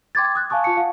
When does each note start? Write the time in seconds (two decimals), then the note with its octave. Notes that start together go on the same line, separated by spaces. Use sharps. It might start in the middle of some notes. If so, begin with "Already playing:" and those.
0.15 G5 C6 D6 G#6 A6
0.35 D#6 F#6
0.50 F5 G#5 A5 C#6 D#6
0.64 F4 A5 C#6 C#7
0.77 F5 F#5